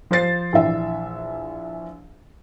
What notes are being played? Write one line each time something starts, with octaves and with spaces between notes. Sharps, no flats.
F3 C5 A6 C7
A#1 E3 D4 E5